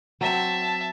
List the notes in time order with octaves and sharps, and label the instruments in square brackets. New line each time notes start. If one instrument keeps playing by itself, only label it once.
[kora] F#3 C4 [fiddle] E5 A5